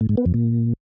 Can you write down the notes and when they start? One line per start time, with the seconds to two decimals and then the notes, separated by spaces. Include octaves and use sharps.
0.01 A2
0.09 G#2
0.17 B3
0.26 F2
0.34 A#2